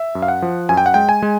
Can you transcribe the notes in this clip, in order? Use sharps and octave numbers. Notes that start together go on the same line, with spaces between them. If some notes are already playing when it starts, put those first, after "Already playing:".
Already playing: E5
F#2
F5
F#5
F3
F#2 G#5
G5
F#5
G#3 G5
G#5
G#3